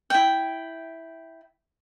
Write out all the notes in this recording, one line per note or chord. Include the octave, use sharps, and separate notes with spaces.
E4 G5